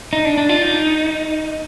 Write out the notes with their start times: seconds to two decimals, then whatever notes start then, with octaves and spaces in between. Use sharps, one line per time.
0.13 D#4
0.25 D4
0.38 D4
0.49 F4
0.62 D#4